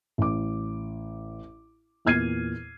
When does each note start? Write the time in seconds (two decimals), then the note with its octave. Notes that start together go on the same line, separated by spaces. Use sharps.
0.18 A1 D6
2.05 E2 A#2 F6 G#6 C7 D#7